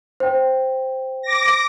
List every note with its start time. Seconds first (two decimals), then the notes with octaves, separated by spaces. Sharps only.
0.20 C5 G5
1.22 D6 A#6